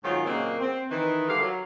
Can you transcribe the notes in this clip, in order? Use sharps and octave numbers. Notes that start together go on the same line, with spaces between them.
G#2 D#3 F#3 C#4 F4
A#2 C#3 F#3 G#3 A#3 C4
C4
D#3 E3 D#4
D3 G3 A#4 D5 F5
F#3